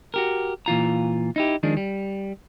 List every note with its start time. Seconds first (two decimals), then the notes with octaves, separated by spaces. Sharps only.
0.14 F#4 G4 A#4
0.66 A#2 E3 F4 A#5
1.36 D#4 E4 G4
1.63 D#3 F3 G#3 D4
1.77 G3